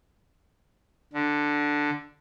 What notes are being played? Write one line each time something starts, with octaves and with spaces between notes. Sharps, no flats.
D3